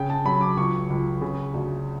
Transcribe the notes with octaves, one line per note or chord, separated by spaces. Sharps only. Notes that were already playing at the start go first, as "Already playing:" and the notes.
Already playing: C#3 G5
A5
F#3 B5
D6
C#2 C#6
C#2
C#3
D2